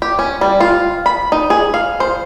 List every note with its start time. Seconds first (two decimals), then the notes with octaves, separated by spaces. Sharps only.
0.02 G4
0.19 C#4
0.41 G3
0.60 F4
1.06 B5
1.32 D#4
1.50 G#4
1.74 F5
2.00 C5